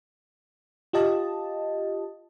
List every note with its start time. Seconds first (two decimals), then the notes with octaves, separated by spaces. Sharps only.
0.93 F4 G4 D#5 A5